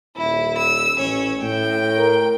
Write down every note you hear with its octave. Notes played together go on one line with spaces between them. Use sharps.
D#1 E4
E6
A1 C#4 C#5
A2 G5
A#4